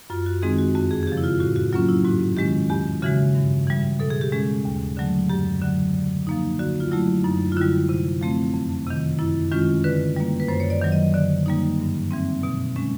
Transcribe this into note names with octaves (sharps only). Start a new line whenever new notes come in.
F#2 F4
F#4
D#3 G#3 C4 D#4 G#4
F#4
F2 F#4
G#4
G#4
C#3 F3 G4
E4
F4
A2 F#4
F#4
F#3 A#3 C#4 F4
E4
G#2 F#4
D#3 G#3 C#4 G4
E2 G4
C#3 E3 G#3 F#4
G2
E3 G3
B2 A4
G#4
G4
G#3 C#4 G#4
D#2
D3 F#3 A3
F#2 G4
D3 F#3
D3
F3 A#3 D#4
D3 F#4
F4
F#3 A3 E4
F#2 D#4
F4
D3 G3 E4
C3
F3 A3 C4
F2
C3 D#3
F#2 E4
D#3 G#3 C#4 F4
D3 B4
G3 A#3
B4
F#2 C5
C#5
D5
D#3 F#3
D#5
D3 D5
G3 A#3 D#4
G2
E3 G3 C4
B2
G#3 C#4